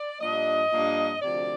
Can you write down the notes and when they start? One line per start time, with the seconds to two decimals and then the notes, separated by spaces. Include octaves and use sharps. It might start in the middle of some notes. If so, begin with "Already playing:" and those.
Already playing: D5
0.21 G2 F3 A#3 D4 D#5
0.72 G2 F3 A#3 D4
1.21 D2 C3 F3 D5